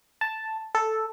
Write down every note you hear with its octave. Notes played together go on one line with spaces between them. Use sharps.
A5
A4